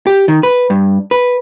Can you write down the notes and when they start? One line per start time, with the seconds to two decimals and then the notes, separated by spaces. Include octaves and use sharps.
0.07 G4
0.28 D#3
0.43 B4
0.70 G2
1.11 B4